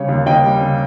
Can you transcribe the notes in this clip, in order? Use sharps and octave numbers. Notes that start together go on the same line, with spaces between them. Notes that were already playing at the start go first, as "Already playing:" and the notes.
Already playing: C#3 G3 C#5
D#2
D#2 D#5 G5
G3
C#3